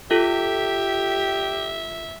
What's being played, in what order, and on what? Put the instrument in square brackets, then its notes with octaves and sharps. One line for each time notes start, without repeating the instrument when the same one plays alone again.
[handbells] F4 A4 [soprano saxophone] G4 [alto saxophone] E5